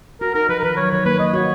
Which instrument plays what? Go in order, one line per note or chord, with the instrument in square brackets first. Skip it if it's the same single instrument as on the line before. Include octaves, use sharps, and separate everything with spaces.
[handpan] F#4 [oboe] A#4
[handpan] D#4 [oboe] A#4
[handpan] F3 [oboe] B4
[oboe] A#4
[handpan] D#3 [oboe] B4
[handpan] F#3 [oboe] C#5
[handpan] D#3 [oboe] C#5
[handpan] A#3 [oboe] B4
[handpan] A#3 [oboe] D#5
[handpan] F#4 [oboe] C#5